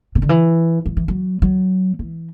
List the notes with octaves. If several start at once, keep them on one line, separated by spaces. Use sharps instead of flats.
C3
D3
E3
F#3
E3
F#3
F#3
E3